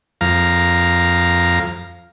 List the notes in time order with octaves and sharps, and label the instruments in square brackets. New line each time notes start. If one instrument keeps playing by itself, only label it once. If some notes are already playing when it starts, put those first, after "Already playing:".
[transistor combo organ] F2 F5 A#5